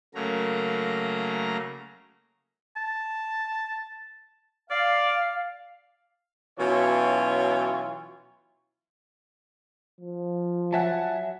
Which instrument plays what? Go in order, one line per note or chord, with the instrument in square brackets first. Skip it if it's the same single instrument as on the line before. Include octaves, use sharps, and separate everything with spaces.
[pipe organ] C#3 F#3 A3 A#3 A#5
[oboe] A5
[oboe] D5 [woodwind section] F5
[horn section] B2 E3 F#3 C#4 F4 C#5
[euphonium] F3
[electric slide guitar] F#3 E5 [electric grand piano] F#5 G#5 A5